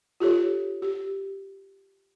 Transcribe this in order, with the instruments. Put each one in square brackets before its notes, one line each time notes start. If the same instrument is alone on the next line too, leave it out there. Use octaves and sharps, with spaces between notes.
[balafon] F4 G4 A4 C#5
G4